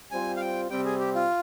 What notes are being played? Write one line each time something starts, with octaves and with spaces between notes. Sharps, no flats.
G3 C4 F4 C5 G#5
F5
G5
C3 G3 C4 G5
G#4
G4
F4